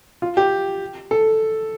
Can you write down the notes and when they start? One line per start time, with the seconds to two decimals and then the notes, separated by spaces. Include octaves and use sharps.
0.22 F4
0.37 G4
1.11 A4